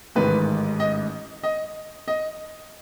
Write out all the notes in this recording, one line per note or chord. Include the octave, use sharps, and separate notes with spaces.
A1 G#2 D#3 B4
D#5
D#5
D#5